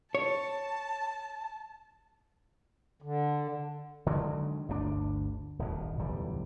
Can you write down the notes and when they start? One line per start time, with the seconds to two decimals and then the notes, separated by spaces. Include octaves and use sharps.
0.15 C#5 A5
3.02 D3
4.06 D3 D#3 F#3 G#3
4.68 G1 D2 C#3 D4
5.59 D#1 G#1 F2
5.98 D1 B1 E2 G3